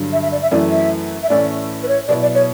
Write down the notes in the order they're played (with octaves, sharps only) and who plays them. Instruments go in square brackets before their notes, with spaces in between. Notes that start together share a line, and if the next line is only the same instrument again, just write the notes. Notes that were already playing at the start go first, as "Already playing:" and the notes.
Already playing: [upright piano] G2 D3 F#3
[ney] E5
E5
D5
E5
[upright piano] F#2 E3 A3 [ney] D5
[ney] E5
E5
[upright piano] A2 E3 A3 C#4 [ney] D5
[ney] B4
C#5
[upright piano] B2 F#3 B3 E4 [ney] D5
[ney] D5
C#5